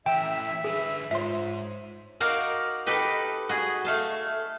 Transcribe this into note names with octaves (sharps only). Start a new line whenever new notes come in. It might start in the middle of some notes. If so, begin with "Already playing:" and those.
E3 C#4 E5 G5 E7
D3 G#4 B4
G#2 F4 C5 C#5 E5 C6
D#4 F#4 A#4 D5 F5
D#4 G4 A4 B4
F#4 G#4
A3 F5 A5